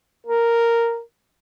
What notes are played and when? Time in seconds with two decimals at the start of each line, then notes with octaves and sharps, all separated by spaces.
0.27 A#4